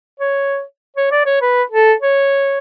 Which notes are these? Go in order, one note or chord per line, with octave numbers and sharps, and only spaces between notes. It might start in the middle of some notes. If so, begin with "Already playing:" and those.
C#5
C#5
D5
C#5
B4
A4
C#5